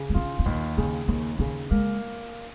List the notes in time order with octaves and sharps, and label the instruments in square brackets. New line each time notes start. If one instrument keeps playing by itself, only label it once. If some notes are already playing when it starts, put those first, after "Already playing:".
Already playing: [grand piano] C#3
[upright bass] A#3
[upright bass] C#4 [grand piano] F4
[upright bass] C#4
[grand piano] D#2 [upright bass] A#3
[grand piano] C#3 [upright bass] A#3
[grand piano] D#2 [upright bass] A#3
[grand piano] C#3 [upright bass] C#4
[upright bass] G#3 [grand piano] A#3